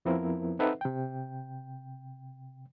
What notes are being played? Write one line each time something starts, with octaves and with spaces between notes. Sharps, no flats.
F2 F3 B3 C4 E4 A#4
C4 D#4 A4 B4 E5 F#5
C3 G5